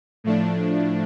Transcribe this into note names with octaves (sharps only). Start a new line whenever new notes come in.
A2 F3 A3 D4